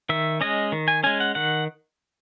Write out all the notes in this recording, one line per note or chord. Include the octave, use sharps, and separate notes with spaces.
D#3 E5
G#3 C#4 D#5
D#3
G#5
G#3 C#4 G#5
F#5
D#3 F#5